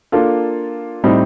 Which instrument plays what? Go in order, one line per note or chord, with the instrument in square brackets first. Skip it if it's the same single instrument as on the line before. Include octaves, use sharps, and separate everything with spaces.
[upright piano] A#3 D4 F4 A4
A2 G3 C4 D#4